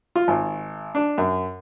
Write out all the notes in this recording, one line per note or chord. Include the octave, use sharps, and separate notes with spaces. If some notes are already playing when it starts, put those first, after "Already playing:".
F4
G#1
D4
F#2